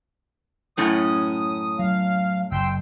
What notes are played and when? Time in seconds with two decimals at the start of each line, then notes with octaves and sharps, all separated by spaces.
0.77 F#2 A2 C#4 D#6
1.79 F#3 F5
2.52 F#1 G5 C6 E6